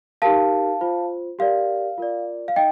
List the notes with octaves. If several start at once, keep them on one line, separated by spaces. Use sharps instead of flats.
D#4 G4 A#4 F5 A5
F4 C5
G4 A#4 D5 F5
F4 A#4 D5
F5
D#4 D#5 G5